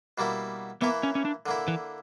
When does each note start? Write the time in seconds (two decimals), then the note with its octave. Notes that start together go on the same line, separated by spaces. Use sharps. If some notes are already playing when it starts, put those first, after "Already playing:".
0.18 B2 G3 A#3 E4
0.81 E3 A#3 B3 E4
1.03 C#4
1.15 C#4
1.25 D4
1.46 D3 A#3 E4
1.68 E3